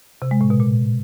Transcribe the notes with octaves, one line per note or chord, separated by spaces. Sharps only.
C3
G#3
A2
B2
A#2